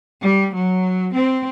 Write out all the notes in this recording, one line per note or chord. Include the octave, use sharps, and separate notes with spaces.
G3
F#3
C4